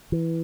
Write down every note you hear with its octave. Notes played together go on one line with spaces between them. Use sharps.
E3